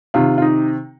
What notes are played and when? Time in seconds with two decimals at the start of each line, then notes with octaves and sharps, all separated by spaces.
0.14 C3 D#3 F4
0.38 F4
0.42 D#4